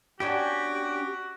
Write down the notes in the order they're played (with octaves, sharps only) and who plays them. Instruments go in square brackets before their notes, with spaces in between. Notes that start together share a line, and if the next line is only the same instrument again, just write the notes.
[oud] B3 C#4 D4 [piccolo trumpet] F#4 [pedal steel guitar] G4